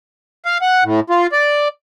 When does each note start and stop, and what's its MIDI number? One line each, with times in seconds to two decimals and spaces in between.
0.46 0.58 77
0.62 0.84 78
0.84 1.00 45
1.10 1.27 65
1.32 1.68 74